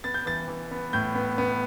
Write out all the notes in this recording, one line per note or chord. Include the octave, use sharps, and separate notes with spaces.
B3 A6
G6
E3 A6
E3
B3
A2 G6
B3
B3